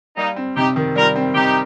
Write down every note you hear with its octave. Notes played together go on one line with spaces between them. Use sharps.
G3 A#3 D#4
C4
C3 D#4 G4
D#3
G3 F4 A#4
C4
C3 D#4 G4